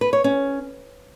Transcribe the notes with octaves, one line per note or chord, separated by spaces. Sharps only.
B4
C#5
C#4